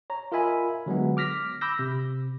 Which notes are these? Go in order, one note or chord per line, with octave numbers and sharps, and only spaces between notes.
C#5 A#5
F4 A#4 D#5 E5 G#5 B5
D3 F#3 G#3 B3
D6 F6 A#6 B6
B5 D6 E6 G6 A#6
C3